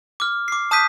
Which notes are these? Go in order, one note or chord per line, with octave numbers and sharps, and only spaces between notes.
D6 F6
D6 C7
A5 D#6 F#6 G6 B6 D#7